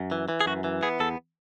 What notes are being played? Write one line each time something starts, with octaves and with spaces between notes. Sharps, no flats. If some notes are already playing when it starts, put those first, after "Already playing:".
Already playing: F#2
E3
E3
G#4
F#2 F#4
E3
B3 G#4
E2 A4